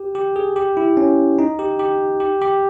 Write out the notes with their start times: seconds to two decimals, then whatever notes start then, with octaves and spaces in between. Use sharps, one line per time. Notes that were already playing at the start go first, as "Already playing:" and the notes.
Already playing: G4
0.15 G4
0.36 G#4
0.56 G4
0.77 E4
0.97 C#4
1.39 D#4
1.59 G4
1.79 G4
2.20 G4
2.41 G4